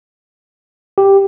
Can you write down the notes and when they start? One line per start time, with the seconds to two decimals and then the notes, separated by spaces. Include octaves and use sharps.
0.98 G4